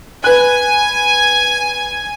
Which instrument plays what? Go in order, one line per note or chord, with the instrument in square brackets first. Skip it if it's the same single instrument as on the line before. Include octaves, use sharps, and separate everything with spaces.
[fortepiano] B4 F#6 [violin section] G#5